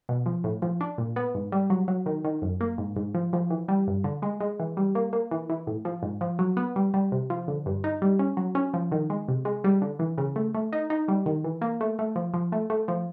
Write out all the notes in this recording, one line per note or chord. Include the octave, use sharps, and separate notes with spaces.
B2
F3
A2
F3
D4
A#2
B3
G#2
G3
F#3
F#3
D#3
D#3
F#2
A#3
G#2
G#2
F3
F3
E3
G3
G2
D3
G#3
G#3
E3
G3
A#3
A#3
E3
E3
A2
F3
G#2
F3
F#3
B3
G3
G3
C3
F3
D3
G2
D#4
G3
C#4
F#3
C#4
F3
D#3
G#3
C3
G#3
G3
D3
E3
C#3
A3
A3
D#4
D#4
G3
D#3
E3
A#3
A3
A3
F3
F3
A3
A3
F3